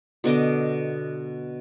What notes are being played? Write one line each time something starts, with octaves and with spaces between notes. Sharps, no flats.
B2 D3 D#5 D6